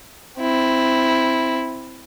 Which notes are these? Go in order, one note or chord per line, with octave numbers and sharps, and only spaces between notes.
C4 E4